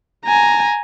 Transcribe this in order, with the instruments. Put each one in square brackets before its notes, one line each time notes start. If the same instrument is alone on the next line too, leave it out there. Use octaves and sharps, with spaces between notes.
[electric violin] G#5 A#5